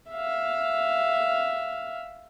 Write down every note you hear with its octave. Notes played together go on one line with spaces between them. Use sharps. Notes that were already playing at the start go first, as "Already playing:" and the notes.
E5 F5